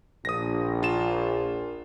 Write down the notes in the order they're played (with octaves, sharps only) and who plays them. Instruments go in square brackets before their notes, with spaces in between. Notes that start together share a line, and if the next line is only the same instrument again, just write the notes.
[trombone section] A#1 [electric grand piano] D#6 A#6
[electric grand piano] F4 E7